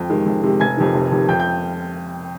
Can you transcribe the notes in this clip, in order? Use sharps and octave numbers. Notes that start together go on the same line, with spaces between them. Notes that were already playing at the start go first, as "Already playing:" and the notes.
Already playing: F2 G5
C3 D#3 G#3
F2
C3 D#3 G#3
F1 G#5 G#6
F2 C3 D#3
F1
F2 C3 D#3
F2 G5 G6
G5 G6